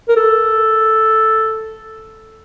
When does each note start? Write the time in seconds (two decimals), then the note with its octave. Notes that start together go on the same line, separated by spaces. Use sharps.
0.09 A#4
0.17 A4